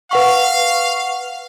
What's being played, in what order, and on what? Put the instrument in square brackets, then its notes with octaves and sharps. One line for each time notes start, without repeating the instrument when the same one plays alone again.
[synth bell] B4 F#5 C#6 [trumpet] F5